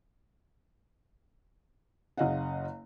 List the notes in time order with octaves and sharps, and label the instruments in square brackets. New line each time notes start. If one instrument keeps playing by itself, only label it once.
[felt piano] F#1 C#3 D#5 F5 F#5